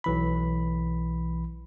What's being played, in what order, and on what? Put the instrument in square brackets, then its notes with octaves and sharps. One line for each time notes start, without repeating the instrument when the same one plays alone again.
[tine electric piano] B1 E3 B5